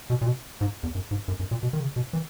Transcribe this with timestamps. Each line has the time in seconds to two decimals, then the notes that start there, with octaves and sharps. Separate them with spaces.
0.10 B2
0.21 A#2
0.26 B2
0.61 G#2
0.83 E2
0.95 F#2
1.11 G#2
1.28 F#2
1.40 F#2
1.51 A#2
1.63 B2
1.73 D#3
1.80 C#3
1.96 B2
2.13 E3